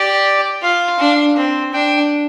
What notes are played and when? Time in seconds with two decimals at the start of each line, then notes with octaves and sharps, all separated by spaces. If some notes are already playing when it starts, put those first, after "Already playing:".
Already playing: G4 D5
0.63 F4 F5
0.99 D4
1.36 C4
1.73 D4 G5